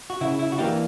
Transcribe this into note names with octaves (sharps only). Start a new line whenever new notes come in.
F#4
C#3 E4
E4
F#4
E3 A#3 D4 G4